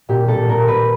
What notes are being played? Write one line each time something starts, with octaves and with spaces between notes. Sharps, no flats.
A#2 G4
A#2 A4
A#2 A#4
A#2 B4